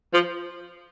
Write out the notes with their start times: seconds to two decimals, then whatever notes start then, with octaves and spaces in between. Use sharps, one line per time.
0.13 F3